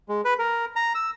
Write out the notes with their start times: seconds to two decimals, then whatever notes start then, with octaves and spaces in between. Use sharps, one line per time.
0.09 G#3
0.25 B4
0.39 A#4
0.76 A#5
0.95 E6